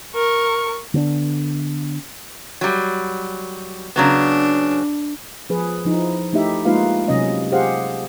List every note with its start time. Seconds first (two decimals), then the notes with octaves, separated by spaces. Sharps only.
0.15 A#4 C#6
0.94 D3 B3 C#4 D4
2.61 F#3 G3
3.96 C#3 F#3 B3 D4
5.50 F3 G#4 B4
5.85 F3 D#4 E4
6.33 A3 D#4 E4 G4 E5
6.65 G#3 A#3 D#4 F4 B4 F5
7.08 C3 F#3 C#4 D#5
7.52 G4 G#4 C5 F5 F#5